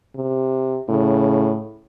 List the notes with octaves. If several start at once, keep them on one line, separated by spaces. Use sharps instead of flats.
C3
A2 C#3